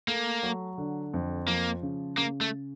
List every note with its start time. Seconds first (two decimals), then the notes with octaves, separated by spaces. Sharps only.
0.08 A3 A#3
0.43 F#3
0.78 D3
1.14 F2
1.48 F3 A#3
1.82 C#3
2.17 C#3 A#3
2.41 A3